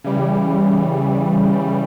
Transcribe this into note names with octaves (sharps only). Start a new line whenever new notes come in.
C#3 E3 G3